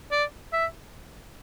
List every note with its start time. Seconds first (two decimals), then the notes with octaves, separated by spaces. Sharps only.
0.11 D5
0.53 E5